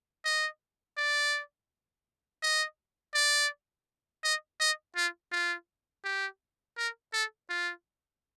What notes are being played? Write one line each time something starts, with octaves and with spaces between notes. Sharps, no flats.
D#5
D5
D#5
D5
D#5
D#5
F4
F4
G4
A#4
A4
F4